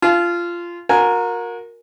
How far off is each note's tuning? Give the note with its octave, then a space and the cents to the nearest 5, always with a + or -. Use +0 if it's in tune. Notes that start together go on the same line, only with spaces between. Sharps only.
F4 -15 A5 -45
F#4 -40 A#4 +0 G#5 +0